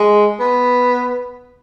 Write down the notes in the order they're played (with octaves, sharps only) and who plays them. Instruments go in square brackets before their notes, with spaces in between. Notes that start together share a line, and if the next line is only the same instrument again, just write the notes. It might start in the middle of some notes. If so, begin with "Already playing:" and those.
Already playing: [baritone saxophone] G#3
B3